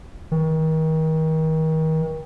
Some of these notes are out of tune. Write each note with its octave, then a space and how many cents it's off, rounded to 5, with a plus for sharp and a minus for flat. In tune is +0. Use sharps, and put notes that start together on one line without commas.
D#3 +35